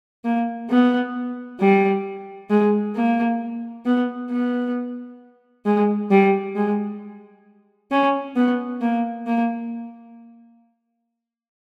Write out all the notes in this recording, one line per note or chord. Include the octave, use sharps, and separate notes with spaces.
A#3
B3
G3
G#3
A#3
B3
B3
G#3
G3
G#3
C#4
B3
A#3
A#3